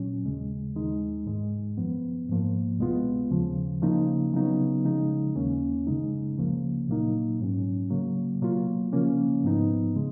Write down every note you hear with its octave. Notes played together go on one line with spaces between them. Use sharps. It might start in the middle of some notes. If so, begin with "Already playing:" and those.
Already playing: A#2 F#3 C#4
D#2 C#3 G#3
D#2 D#3 G#3 D#4
G#2 D#3 G#3
F#2 F3 B3
G#2 F3 A#3
C#2 B2 G#3 B3 F4
D#2 C#3 F3
C#3 F3 A#3 D#4
C#3 F#3 B3 D#4
C#3 F3 G#3 D#4
D#2 D#3 A#3 C#4
F#2 C#3 G#3 D#4
C#2 C#3 F3 A#3
A#2 F#3 A#3 D#4
G#2 F#3 C#4
C#3 F#3 A#3
B2 F#3 A#3 F4
C#3 F3 A#3 C#4
G#2 F3 B3 D#4
C#3 G#3